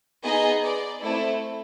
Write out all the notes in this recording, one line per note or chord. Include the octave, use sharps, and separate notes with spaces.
B3 D#4 G#4 D#5
D5
A3 C4 E4 A4